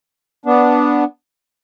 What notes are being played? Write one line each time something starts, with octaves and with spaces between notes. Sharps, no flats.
B3 D4